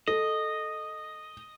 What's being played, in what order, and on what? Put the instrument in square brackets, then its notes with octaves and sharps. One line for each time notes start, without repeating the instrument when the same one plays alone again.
[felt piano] A4 [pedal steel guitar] D#5